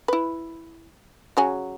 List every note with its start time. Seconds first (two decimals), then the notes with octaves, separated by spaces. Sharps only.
0.08 E4 B4
1.37 C#3 F#3 G#5